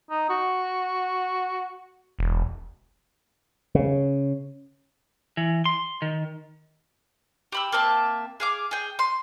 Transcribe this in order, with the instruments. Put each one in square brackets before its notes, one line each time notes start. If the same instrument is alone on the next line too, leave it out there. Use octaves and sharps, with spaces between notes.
[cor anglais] D#4
F#4
[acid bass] E1
[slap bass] C#3
[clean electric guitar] E3
C6
D#3
[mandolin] G4 B5 E6
A#3 C4 E5 A5
G#4 F5 D6
G#4 G5
C6